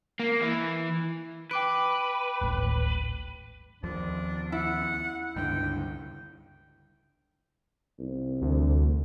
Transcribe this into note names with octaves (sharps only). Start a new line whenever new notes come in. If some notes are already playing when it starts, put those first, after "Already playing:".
A#3
E3
B4 G5 D6 D7
D1 G#1 A2
D#2 F3 D4
E4 F#5
C#2 G2 D3 G5
C2
D2